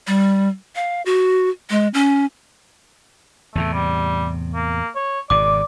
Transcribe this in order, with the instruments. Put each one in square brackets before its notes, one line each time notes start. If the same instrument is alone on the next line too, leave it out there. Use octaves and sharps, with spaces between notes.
[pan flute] G3
F5
F#4
G#3
C#4
[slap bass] E2 A2 C3 [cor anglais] A3
[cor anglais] G3
A#3
C#5
[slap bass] G#1 B2 [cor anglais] D5 [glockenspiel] D6